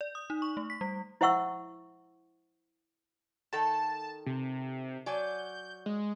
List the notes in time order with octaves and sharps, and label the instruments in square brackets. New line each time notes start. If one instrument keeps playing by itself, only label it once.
[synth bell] D5
D#6
D#4
C#6
A3
B6
G3
[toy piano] E4 C5 E5 F#5 C#6 E6
[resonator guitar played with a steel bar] D#3 A4 G5 [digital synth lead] A5
[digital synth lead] C3
[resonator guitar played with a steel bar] F#3 D5 G#5 [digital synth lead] G6
[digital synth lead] G#3